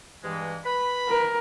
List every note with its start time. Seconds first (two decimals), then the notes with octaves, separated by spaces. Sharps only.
0.23 G2 E3 G#3
0.65 B4 B5
1.09 A#4